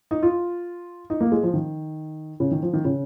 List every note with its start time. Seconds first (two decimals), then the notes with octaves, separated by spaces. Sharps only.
0.11 D#4
0.23 F4
1.10 D#4
1.21 A#3
1.32 G#3
1.43 F3
1.54 D#3
2.40 C#3
2.51 D#3
2.62 F3
2.73 D#3
2.85 C#3